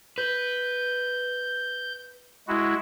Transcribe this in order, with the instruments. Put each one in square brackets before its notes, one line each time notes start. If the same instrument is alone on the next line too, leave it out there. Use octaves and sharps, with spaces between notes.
[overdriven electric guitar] B4 [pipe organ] G6
[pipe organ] G#3 E4 F#4